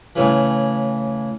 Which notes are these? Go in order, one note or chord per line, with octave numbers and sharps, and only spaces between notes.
A2 C#3 E3